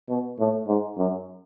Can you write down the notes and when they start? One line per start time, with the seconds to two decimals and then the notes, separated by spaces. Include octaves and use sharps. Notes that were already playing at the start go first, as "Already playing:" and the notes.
0.09 B2
0.39 A2
0.67 G#2
0.97 F#2